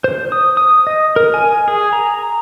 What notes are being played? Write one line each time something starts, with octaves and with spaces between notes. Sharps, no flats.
C5
D#6
D#6
D#5
A#4
G#5
G#4
A#5